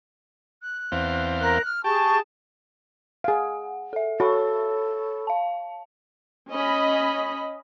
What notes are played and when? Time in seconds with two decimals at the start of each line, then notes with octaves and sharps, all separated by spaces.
0.62 F#6
0.92 E2 C4 F5
1.40 A#4 F#6
1.63 F6
1.84 G4 G#4 A5 C#6
3.24 G#4 F5 F#5
3.93 A4 E5
4.20 F#4 A4 C#5 B5 C#6
5.27 F5 A5
6.50 C#4 D#5 B5